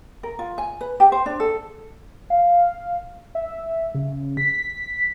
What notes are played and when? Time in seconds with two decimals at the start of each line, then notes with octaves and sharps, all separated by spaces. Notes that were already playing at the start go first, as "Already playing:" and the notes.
0.23 A#4
0.39 F4
0.58 G#5
0.81 B4
1.00 G4
1.12 C5
1.26 D4
1.40 A4
2.30 F5
3.35 E5
3.95 C#3
4.37 B6